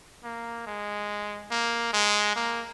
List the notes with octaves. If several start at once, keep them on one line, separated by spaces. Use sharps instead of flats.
A#3
G#3
A#3
G#3
A#3